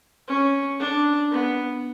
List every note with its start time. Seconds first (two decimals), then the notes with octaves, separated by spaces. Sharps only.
0.27 C#4
0.79 D4
1.31 B3